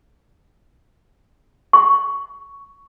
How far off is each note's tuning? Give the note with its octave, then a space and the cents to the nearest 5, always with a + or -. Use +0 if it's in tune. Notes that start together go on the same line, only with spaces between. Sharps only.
C#6 +10